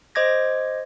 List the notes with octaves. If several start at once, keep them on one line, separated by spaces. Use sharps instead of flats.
C5 D#5 D6 G#6 A#6